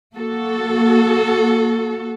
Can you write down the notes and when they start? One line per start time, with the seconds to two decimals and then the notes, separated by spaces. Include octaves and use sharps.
0.15 A#3 F#4 A4